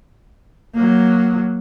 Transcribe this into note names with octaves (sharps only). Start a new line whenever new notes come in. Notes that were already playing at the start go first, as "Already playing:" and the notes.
F#3 A#3